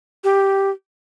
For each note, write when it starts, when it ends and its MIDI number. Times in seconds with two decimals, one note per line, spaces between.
0.24 0.70 67